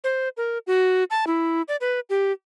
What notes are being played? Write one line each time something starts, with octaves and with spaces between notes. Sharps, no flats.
C5
A#4
F#4
A5
E4
D5
B4
G4